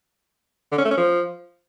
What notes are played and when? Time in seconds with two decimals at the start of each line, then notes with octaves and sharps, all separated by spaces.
0.72 D3
0.78 C#4
0.85 A3
0.91 C#4
0.97 F3